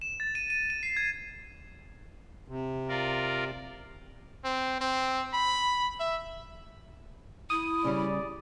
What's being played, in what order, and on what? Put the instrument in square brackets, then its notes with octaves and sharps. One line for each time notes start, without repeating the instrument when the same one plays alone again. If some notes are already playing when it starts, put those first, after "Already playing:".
[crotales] E7
A6
D#7
D#7
D#7
C7
G#6
[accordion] C3
[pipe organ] F4 A#4 D5
[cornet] C4
C4
B5
E5
[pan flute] E4 [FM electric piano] D#6
[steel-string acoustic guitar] C#3 G3 [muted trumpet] D5